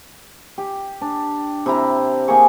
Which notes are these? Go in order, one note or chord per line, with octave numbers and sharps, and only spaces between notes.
G4
D4
C3 E4 A#5
A#3 G4 G#4 C#6